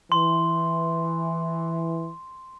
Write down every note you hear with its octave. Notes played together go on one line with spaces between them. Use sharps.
E3 C6